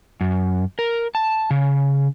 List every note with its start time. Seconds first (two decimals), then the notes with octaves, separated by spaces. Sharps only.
0.21 F#2
0.79 A#4
1.15 A5
1.51 C#3